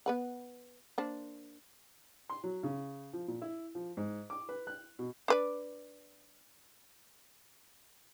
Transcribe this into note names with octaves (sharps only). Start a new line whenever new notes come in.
B3 B4 F#5
A#3 D4 C5
C6
F#3
C#3
F3
A#2
E4
F3
G#2
D6
B4
F#6
B2
D4 B4 D5